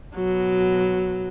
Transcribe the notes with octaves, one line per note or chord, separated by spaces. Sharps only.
B2 F#3